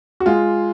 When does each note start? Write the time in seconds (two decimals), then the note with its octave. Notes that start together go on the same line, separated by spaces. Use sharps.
0.20 F#4
0.26 G#3 F4